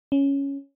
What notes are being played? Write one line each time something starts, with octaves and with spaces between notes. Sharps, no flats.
C#4